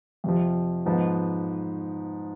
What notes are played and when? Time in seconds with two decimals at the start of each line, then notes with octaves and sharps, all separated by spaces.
0.24 F2 C3 F3
0.86 G#2 F3 B3 D#4